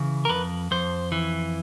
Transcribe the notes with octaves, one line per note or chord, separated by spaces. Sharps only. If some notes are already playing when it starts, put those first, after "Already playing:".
Already playing: C#3 E3
A#4
F2 B4
F2 C5
E3